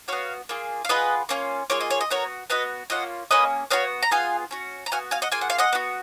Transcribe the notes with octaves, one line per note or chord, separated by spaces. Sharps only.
B3 F#4 C#5 F5
A#3 F4 G#4
F5
B3 F4 G#4 B4 D#5
A#3 C#4 F4
A#3 F4 G#4 C#5
D#5
C#5
D#5
B3 F#4 A#4 C#5
B3 F#4 B4 D#5
A#3 C#4 F4 D#5 F#5
A#3 C#4 G#4 B4 D#5
B3 F#4 C#5 F5
A#5
B3 F4 G#4 F5 G#5
C#4 F#4
A#5
B3 F#4 F5 G#5
F5 G#5
D#5 F#5
A#3 F4 G#4 G#5
F#5
F5
D#5 F#5
B3 F#4